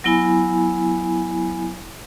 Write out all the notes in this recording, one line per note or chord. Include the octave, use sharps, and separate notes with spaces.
F#3 B3 E4 G#5 B5